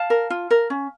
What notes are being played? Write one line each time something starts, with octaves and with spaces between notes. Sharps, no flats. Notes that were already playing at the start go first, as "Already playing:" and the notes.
Already playing: F5 A5
A#4
F4
A#4
C#4